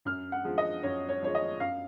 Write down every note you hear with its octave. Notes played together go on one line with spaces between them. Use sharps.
F#2 F6
F#5
F3 G#3
D#5
F#2 C#5
C#5
F3 G#3 C#5
D#5
F#2 F5